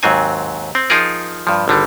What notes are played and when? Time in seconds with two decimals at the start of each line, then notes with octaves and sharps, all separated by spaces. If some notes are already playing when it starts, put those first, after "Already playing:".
0.03 D#2 G#2 F#3 C4 G#5
0.75 C4
0.90 F3 D#4 F4 G#4 A#4
1.47 G2 F3
1.68 G#1 D3 G3